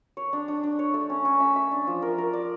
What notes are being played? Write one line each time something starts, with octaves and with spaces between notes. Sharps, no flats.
C#5
D4
D4
D4
C#5
A3
C#4
C#4
E5
E5
D4
F3
A#4
A#4
D5